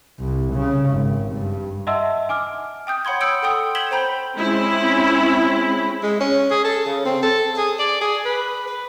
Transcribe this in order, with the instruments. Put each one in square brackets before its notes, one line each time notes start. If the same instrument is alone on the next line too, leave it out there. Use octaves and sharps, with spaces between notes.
[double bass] C2
C#3
G#1
G2
[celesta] D#5 E5 F#5 A5 C6 E6
G#5 D6 F6
[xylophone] G5 D#6 G6
C#5 F#5 B5 C6 G#6
B5 D#6 E6 G6 C#7 D7
A4 F#5 G5 C6 D#6 E6
G6 G#6 B6 E7 F#7 G7
C5 G5 A#5 B5 G6
[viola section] G#3 C4 C#4 E4
[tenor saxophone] G#3
C#4
G#4
A4
C#3
C4
A4
G#4
D5
G#4
B4
B4